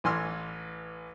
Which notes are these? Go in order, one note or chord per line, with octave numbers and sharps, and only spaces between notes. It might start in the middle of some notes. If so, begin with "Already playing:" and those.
A1 E3 G#5 C6 E6 F6